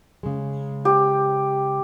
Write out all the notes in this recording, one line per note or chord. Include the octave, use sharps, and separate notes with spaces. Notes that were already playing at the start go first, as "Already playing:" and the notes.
C#3 G#3
G4